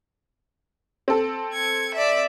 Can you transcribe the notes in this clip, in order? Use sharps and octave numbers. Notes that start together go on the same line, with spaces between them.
C4 A4
G#6 C#7
D5 E5